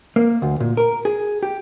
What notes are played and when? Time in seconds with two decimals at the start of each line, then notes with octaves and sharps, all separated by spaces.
0.16 A#3
0.42 D2
0.60 A#2
0.77 A#4
1.05 G#4
1.43 G4